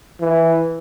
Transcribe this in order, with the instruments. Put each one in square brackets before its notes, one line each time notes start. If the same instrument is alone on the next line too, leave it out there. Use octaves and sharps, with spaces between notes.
[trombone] E3